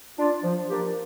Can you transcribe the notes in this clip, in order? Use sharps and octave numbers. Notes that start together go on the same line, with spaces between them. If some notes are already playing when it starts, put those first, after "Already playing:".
D4 F4
F3
A#3 D4 G4